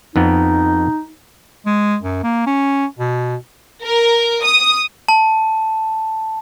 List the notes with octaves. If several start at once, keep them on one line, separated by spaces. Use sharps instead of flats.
F2 B3 D#4
G#3
F#2
A#3
C#4
B2
A#4
D#6
A5